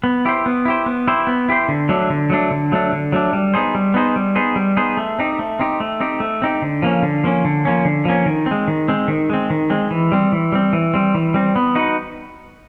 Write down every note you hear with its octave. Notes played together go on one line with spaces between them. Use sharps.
B3
E4 G4 C5
B3
E4 G4 C5
B3
E4 G4 C5
B3
E4 G4 C5
D3
F#3 A3 D4
D3
F#3 A3 D4
D3
F#3 A3 D4
D3
F#3 A3 D4
G3
B3 D#4 G#4 C5
G3
B3 D#4 G#4 C5
G3
B3 D#4 G#4 C5
G3
B3 D#4 G#4 C5
A3
C4 D#4 G4
A3
C4 D#4 G4
A3
C4 D#4 G4
A3
C4 D#4 G4
D3
F3 A#3 C#4
D3
F3 A#3 C#4
D3
F3 A#3 C#4
D3
F3 A#3 C#4
D#3
G#3 C4
D#3
G#3 C4
D#3
G#3 C4
D#3
G#3 C4
E3
G3 C4
E3
G3 C4
E3
G3 C4
E3
G3 C4
B3
D#4 F#4 B4